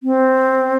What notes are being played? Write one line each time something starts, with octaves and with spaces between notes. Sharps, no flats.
C4